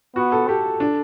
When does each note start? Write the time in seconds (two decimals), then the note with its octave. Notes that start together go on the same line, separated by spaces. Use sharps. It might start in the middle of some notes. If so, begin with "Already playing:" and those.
0.16 B3 F#4
0.32 A4
0.48 G4 A4
0.80 D4